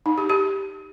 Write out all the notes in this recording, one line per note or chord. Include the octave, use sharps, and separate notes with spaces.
D#4
G4
G4